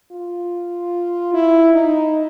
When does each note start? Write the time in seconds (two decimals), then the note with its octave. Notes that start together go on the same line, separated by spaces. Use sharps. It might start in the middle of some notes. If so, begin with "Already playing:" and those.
0.12 F4
1.34 E4
1.74 D#4